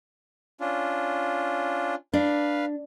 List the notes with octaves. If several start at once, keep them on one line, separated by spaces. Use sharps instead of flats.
C#4 D4 F4
D4 B4 F5